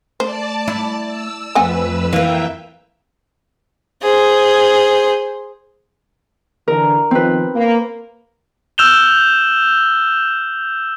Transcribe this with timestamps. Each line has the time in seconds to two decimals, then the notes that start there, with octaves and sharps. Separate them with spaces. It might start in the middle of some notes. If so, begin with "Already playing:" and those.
0.20 A3 C5 D5 A5
0.68 E4
1.08 E6
1.55 F2 A3 C4 B4 F#5 G#5 E6
2.13 E3 A#3 E5 F5 G5
4.02 G#4 C5
6.68 D3 E3 A#4
7.11 D#3 F3 C4 B4
7.54 A#3
8.78 E6 F6 G6 E7 F7 G7